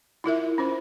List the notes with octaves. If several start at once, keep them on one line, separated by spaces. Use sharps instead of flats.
E4 F4 A#4 E5
C#4 F4 C5